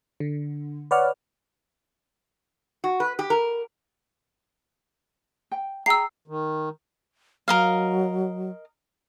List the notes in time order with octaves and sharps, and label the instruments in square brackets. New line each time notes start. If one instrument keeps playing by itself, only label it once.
[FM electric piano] D3
B4 C#5 D5 F#5 F6
[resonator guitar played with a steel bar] F#4
B4
G4
A#4
[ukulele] G5
[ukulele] G#4 G5 A#5 [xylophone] E6 C7
[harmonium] D#3
[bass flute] F#3 [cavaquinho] A#4 D#5 F5